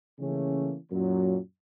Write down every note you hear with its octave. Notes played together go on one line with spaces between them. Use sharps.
C#3 E3 A3 A#3 C#4
F#2 A#2 F#3